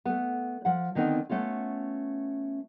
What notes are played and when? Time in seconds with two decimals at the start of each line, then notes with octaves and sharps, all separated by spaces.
0.05 A3 B3
0.65 F3 F#5
0.95 D3 D#3 B3 C4 D#4
1.29 A3 B3 C#4 F4